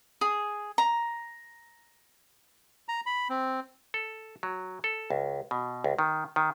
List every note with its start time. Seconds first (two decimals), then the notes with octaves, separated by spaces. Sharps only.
0.21 G#4
0.78 A#5
2.89 A#5
3.06 B5
3.30 C4
3.94 A4
4.43 F#3
4.84 A4
5.10 C#2
5.51 B2
5.84 C#2
5.99 D#3
6.36 D#3